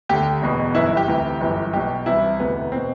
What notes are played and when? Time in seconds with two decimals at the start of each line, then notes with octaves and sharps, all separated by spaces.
0.09 D2 D3 G4
0.42 E1 E2 B2
0.75 G1 F#2 E3 E4
0.86 E4
0.97 G4
1.08 D2 C3 E3
1.41 G1 F#2 E3
1.73 B1 B2 G4
2.06 C2 C3 E3 E4
2.39 E1 D2 C3 E3 B3
2.72 B2 C4